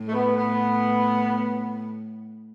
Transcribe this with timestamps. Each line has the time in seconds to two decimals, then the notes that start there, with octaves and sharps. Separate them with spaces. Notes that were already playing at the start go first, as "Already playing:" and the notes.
Already playing: A2
0.09 A3
0.13 B3
0.37 B3